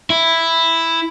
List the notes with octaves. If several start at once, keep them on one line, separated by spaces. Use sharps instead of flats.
E4